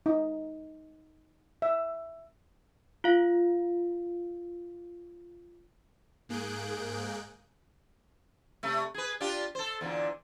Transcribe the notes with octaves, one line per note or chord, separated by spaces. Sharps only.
D#4
E5
F4 F5
G#2 A#3 G#4 F#6 G6 D7
C3 A3
G#4 B4
D4 F4 G4
A4 C5
E2 A#2 D3